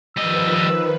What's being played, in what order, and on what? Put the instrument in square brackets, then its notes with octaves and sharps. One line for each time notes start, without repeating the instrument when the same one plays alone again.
[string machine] D#3 F3 B4 [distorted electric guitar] G3 D#5 [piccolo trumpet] E6